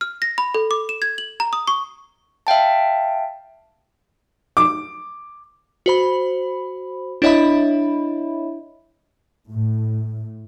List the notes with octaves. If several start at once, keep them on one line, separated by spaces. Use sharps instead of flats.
F6
A#6
B5
A4
D6
E7
G#6
F#7
A#5
D#6
C#6
E5 F5 G5 A5
D6
F#4 C5 B5
D4 E4 C#5 D#5 E5 B5
A2